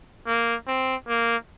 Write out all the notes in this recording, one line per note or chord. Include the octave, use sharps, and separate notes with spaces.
A#3
C4
A#3